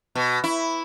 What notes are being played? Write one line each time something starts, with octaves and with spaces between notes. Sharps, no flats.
B2
E4